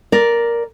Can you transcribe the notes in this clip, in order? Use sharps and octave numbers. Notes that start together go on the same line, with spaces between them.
A#4 D5